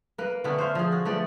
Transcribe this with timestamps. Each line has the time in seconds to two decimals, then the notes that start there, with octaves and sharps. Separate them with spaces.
0.18 A#3 B4
0.44 D3 A3 B3 C#4
0.58 C5 E5 F5
0.75 F3 G#4
0.92 F#4
1.05 F3 A3 B3 D5